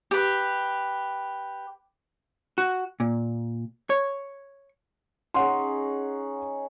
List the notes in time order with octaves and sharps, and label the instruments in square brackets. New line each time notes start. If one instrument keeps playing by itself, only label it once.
[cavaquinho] G4 B4
[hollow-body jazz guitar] F#4
A#2
C#5
[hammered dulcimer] C#4 D#4 G#4 [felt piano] F#5 C6